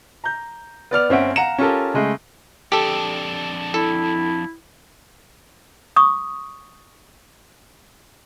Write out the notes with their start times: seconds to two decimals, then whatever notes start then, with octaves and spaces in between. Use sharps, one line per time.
0.24 A#5 G6
0.91 B3 D5 F6 F7
1.09 G1 C4 C#4 E5 F#5 D7
1.36 F5 F#5 A#5 C#7 E7
1.58 C#4 F4 G4 A4 A#4
1.94 C#3 G#3 A3
2.72 F2 D4 G4 A4
3.74 E4 A4
5.96 C#6 D#6